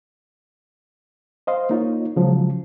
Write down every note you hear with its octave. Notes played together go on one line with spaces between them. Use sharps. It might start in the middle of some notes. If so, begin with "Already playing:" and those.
C5 D#5 F5 C6
A#3 D#4 F4 C#5
C#3 F3 F#3 G#3